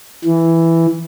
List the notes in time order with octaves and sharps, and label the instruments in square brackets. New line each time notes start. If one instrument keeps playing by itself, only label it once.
[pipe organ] E3